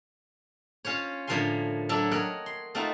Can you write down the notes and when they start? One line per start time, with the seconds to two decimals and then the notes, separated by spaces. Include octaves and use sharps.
0.85 C#4 F4 C5 C#5
1.27 A2 D3 F3 A#4 G#5 C6
1.89 F#3 D4 E4 A4
2.11 A#4 C#5 D#5 F#5 G5
2.46 C6
2.75 A3 C4 D#4 F4 F#4